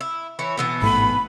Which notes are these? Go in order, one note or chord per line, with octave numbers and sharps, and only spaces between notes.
E4
E3 E4 C#5
B2 E3 B3
A1 G#2 A3 B5